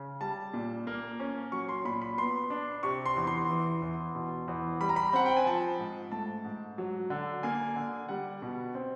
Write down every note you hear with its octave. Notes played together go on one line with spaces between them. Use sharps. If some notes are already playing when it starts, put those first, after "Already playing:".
Already playing: C#3
G3 A5
A#2
A#3
C#4
F#3 C#6
C6
A#2 B5
B5
B3 C6
D4
C3 C#6
C6
E2
C6
E3
E2
B2
E2
G3 B5
A#5
B5
C4 F#5
G5
G#5
F3 A5
G#2
A3 A5
G#2
F#3
D3
A#3 G#5
D3
G3 F#5
B2
C4